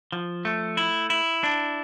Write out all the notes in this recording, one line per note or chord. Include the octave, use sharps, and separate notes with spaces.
F3
A3
E4
E4
D4